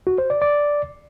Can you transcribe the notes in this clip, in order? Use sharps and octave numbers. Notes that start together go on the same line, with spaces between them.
F#4
C5
D5
D5